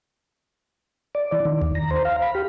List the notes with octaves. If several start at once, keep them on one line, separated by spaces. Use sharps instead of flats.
D5
E3
D#3
D#2
A#5
C5
F5
B5
G4